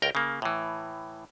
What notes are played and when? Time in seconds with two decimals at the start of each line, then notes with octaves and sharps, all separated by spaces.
0.02 C#2 A#4 G5
0.15 C#3 A#3
0.42 A2 E3